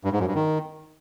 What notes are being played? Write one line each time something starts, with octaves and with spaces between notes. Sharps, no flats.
G2
G#2
F#2
G2
D#3